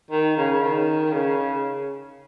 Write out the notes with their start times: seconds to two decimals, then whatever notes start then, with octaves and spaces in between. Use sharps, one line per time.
0.11 D#3
0.37 C#3
0.62 D#3
1.13 C#3